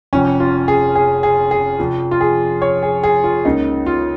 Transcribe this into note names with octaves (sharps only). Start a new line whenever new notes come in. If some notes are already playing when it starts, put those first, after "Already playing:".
F1 F2 F3 C#4
F4
G#4
G#4
G#4
G#4
F1 F2 F3
F4
G#4
C#5
G#4
G#4
F4
C#2 C#3 A#3 D#4
F4